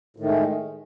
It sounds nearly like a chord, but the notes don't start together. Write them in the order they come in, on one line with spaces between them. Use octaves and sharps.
A2 D#3 A3 G#3